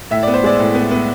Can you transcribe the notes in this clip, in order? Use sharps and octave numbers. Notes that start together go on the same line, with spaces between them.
A2 E5
B3 D5
C5
G#3 D5
A2
B3
B3